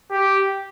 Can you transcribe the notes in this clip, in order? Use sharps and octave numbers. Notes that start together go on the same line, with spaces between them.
G4